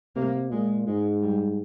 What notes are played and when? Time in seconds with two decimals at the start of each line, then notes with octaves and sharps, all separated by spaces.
0.16 C3 A#3
0.52 A#2 G#3
0.87 G#2 G#3
1.22 G3